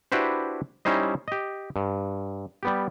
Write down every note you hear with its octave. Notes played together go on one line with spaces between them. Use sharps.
D4 E4 F#4 G4 B4 C5
G3 C#4 D#4 E4 C5 D#5
G4 D#5
G2
G3 B3 G4